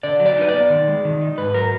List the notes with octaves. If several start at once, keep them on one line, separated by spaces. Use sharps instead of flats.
D3 D5
F#3
D5
D#4 B4
D5
B3
D#3
G#3
D#3
D#4
G#2 B4
F#3 A#4